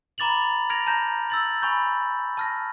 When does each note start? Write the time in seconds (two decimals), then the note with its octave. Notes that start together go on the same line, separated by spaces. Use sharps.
0.18 A#5 B5 D6 A6 F7 F#7
0.70 F6 G#6 A#6 D7 F7
0.86 A5 A#5 G6 A#6
1.30 E6 A6 F#7
1.62 G#5 B5 C#6 G6
2.37 A5 F6 A#6